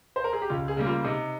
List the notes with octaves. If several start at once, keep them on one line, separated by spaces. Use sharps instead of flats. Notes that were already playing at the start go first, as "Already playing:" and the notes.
C5
A#4
G#4
G4
C#2 F4
G#4
C#3 G3 A#3
F4
C3 D#4